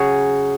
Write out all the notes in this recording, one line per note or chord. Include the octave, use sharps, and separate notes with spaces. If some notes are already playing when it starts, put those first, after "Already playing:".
Already playing: C#3 F#3 C#4 F#4 G#4